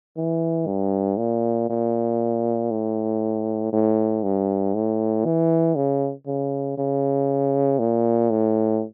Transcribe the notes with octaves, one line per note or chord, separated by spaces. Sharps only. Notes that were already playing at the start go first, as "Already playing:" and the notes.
E3
G2
A#2
A#2
A2
A2
G2
A2
E3
C#3
C#3
C#3
A#2
A2